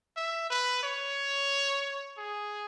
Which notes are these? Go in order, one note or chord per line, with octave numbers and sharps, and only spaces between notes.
E5
B4
C#5
G#4